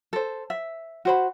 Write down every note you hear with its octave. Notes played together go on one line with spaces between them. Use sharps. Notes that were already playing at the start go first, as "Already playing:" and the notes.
A4 C5
E5
F#4 C5 B5